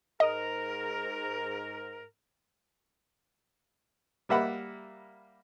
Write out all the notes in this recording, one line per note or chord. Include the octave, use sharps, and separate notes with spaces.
G#2 A#4 D#5
G3 A#3 E5 F#5 B5